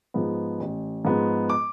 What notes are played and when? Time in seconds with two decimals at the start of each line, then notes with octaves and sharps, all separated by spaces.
0.14 G#2 F3 G#3 B3
0.60 A1
1.05 G#2 F3 G#3 B3
1.50 D6